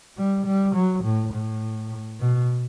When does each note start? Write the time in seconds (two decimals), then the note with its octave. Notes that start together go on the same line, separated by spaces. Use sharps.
0.18 G3
0.45 G3
0.75 F#3
1.03 A2
1.33 A2
2.20 B2